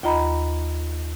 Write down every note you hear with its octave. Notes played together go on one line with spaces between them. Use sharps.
D#2 F4 D#5 A#5 B5